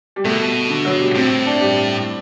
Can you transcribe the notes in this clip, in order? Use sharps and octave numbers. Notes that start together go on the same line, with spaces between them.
G3
B2 A3
D3
F#3
G3
A2 C4
D4
G3